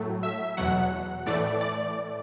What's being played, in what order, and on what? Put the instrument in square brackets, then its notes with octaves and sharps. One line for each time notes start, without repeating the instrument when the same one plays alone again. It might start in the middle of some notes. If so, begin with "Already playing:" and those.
Already playing: [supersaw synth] A2 F#3 A3
E5
E2 B2 F#3 F#5
A2 E3 A3 D5
D5